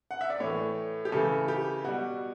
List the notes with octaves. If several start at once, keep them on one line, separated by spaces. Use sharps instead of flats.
F#5
E5
D5
A2 E3 A3 C#5
G4
C#3 E3 A3 A4
G4
B2 G3 F#4